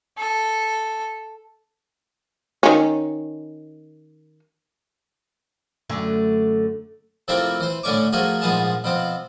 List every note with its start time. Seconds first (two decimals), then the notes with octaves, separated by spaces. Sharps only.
0.18 A4
2.63 D#3 C#4
5.90 F#2 D3 A3
7.28 C3 F3 A3 A#3 C4 E4
7.60 E3 C5
7.83 A2 D3 A3 C#4 C#6 D6
8.13 F3 A3 A#3 F#4 G#4
8.41 A#1 G#2 F3 B3 G#4 A5
8.84 B2 F3 C4